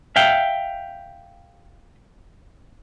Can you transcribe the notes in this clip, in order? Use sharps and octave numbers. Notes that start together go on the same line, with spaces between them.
E5 F5 G5